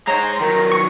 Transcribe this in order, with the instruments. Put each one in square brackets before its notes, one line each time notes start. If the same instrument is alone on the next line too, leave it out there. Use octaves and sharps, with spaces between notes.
[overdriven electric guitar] G#3 C5 [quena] C#5 [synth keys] A#5
[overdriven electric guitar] D#3 F#3 [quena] A#4
[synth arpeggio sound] C#6